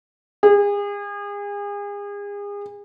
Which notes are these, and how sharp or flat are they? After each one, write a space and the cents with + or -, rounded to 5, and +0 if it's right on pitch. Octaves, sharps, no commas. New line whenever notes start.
G#4 -35